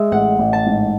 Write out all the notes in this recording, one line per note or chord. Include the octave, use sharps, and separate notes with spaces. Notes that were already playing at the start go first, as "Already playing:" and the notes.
Already playing: G#3 E5
A1 F#5
A1
A5
G#2